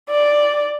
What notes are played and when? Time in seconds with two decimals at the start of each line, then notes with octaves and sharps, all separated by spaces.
0.10 D5